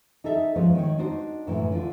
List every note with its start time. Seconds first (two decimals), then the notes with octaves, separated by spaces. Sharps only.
0.24 D#4 G#4 A4 E5
0.56 G#2 F3 B3 C#4
0.75 D#3 C#5
0.98 D4 D#4 F#4 C5
1.47 F#2 A2 D3 E3
1.72 D3 F4